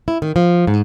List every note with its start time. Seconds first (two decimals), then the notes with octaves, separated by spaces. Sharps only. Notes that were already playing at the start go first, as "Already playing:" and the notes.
0.08 E4
0.22 D#3
0.36 F3
0.67 G#2